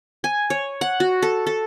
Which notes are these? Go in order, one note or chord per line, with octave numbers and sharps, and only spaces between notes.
G#5
C#5
F#5
F#4
A4
A4